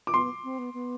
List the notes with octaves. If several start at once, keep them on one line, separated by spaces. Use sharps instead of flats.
D6
B3 C6
C4
B3
B3